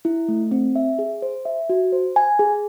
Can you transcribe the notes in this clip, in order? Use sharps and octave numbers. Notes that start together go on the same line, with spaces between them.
E4
A3
C4
E5
G#4
C5
E5
F#4
C5
G#5
G#4